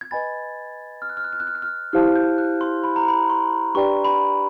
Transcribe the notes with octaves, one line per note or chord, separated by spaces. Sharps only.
G#6
B4 D#5 G#5 B5 A6
F6
F#6
F6
F#6
F6
F#6
F6
F#6
F6
E4 G4 C5 F5 A5 F6
G6
F#6
C6
B5
A#5
B5
C6
D4 G4 B4 D5 G5 C#6
B5